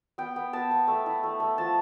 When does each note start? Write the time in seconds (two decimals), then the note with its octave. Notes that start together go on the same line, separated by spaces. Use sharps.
0.18 B3 G5
0.36 B3
0.53 B3 A5
0.71 B3
0.88 A3
1.06 E4
1.23 A3
1.40 A3
1.58 F3 A5